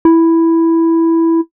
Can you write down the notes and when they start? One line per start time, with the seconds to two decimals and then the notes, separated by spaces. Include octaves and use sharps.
0.05 E4